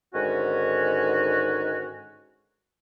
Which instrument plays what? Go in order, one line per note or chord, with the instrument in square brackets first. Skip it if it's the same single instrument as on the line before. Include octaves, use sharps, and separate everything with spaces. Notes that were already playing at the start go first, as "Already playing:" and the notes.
[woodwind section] G#2 D3 D#3 C#4 F#4